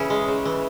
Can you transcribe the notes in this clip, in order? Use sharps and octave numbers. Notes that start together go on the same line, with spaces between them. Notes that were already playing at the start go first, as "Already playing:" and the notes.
Already playing: C#3 E3 C#4 E4 G#4
G#3
C#3
E3